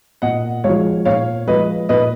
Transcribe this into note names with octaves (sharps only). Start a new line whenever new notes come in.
A#2 D#5 F#5
F3 G#3 C#5 F5
A#2 C#5 F5
F3 G#3 B4 D#5
A#2 B4 D#5